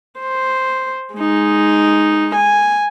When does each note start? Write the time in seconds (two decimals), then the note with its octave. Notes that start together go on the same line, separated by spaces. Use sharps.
0.20 C5
1.15 G#3 D#4
2.35 G#5